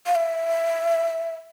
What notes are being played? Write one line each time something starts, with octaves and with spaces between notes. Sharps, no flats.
F5
E5